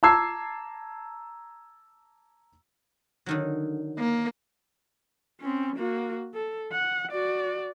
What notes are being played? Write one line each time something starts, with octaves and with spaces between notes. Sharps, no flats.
A5 A#5 D6 E6 G#6 C7
D3 D#3 F#3
A#3
C4 C#4
A#3 F#4
A4
F#5
F#4 D5